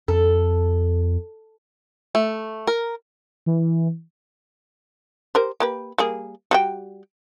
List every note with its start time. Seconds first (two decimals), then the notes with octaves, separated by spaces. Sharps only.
0.08 F2 A4
2.15 A3
2.67 A#4
3.46 E3
5.35 G4 A#4 C5
5.60 A#3 G4 B4
5.98 G3 A#3 G#4
6.51 G3 F#4 G5